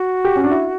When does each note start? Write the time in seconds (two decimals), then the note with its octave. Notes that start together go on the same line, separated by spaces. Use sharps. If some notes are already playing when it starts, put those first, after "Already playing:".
Already playing: F#4
0.25 G4
0.36 C#4
0.44 D4
0.51 E4